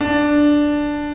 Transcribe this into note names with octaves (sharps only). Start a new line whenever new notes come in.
D4